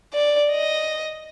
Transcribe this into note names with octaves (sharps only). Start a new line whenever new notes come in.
D5
D#5